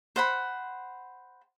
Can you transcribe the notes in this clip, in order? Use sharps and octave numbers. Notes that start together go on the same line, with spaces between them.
C5 F#5 B5